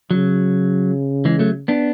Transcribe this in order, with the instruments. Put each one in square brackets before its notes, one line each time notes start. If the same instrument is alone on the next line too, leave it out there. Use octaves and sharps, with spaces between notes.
[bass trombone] C#3 [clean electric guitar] F#3
[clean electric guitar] E3 G#3
F#3 A3
B3 D4